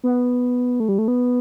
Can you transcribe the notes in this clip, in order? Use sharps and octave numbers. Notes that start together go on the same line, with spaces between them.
B3
A3
G3
A3
B3